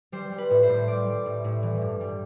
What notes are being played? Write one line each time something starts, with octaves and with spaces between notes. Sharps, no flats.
G3 C5
G3
B4
A2
C5
A2
G3 D5
G3
A2
A2
E3
G2
G3